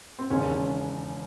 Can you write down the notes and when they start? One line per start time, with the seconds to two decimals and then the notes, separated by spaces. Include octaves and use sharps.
0.19 C4
0.30 E1 D#2 C#3 C#4